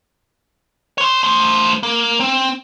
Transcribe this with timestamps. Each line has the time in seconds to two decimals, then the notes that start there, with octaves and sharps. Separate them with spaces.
0.98 C#5 C6
1.23 A3 C5
1.83 A#3
2.20 C4